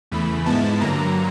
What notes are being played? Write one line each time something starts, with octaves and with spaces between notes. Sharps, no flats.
E2 C#3 E3 A3 B5
G#2 F3 G#3 B3 E4 A5
G2 D3 F#3 A#3 A#5